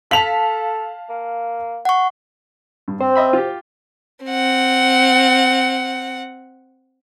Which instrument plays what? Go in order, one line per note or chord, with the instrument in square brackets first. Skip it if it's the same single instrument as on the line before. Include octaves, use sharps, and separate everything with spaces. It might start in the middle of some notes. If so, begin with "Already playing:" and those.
[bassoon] A4 [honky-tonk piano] F5 B6 [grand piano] A5 F7 F#7
[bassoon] A#3
[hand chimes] F#5 C#6
[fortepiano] G2
[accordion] C4 [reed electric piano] C5
[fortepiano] D#5 E5 B5
F4 G4
[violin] C4 F#5